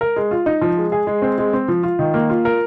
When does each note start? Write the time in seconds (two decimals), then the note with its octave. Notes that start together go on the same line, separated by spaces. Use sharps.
0.01 A#4
0.16 G#3
0.31 F4
0.46 D#4
0.62 F3
0.77 G#3
0.92 G#4
1.07 G#3
1.22 C4
1.38 G#3
1.53 C4
1.68 F3
1.83 F4
1.99 D#3
2.14 A#3
2.30 F4
2.45 A#4